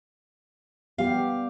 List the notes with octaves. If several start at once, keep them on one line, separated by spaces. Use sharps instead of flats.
G3 B3 G4 F5